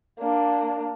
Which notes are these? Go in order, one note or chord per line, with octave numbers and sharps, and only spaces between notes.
A#3 D4